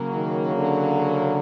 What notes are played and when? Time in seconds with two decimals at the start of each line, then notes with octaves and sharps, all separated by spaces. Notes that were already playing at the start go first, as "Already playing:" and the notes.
Already playing: C#3 F#3 A#3
0.13 D#3
0.56 D3